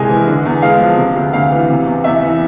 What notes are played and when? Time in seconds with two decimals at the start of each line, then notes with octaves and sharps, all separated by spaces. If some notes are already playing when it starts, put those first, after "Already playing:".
Already playing: C2 C3 G#3 G#5
0.09 E3
0.27 D3
0.45 E2
0.62 G#3 F5
0.80 F3
0.97 C3
1.16 D2
1.33 D2 F5
1.52 E3
1.69 C3
1.86 E2
2.04 E2 E5
2.22 E3